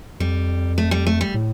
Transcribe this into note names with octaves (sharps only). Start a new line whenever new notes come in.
F2 G3
A3
G3
A3
G3
A2